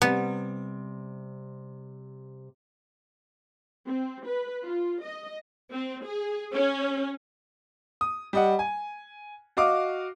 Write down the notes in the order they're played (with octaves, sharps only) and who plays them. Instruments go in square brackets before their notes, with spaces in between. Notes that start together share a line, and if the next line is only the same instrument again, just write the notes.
[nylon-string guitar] C3 G3 [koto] B3
[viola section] C4
B4
F4
D#5
C4
G#4
C#4
[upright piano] D#6
G3 D#5 F#5
G#5
F#4 D#5 F5 D6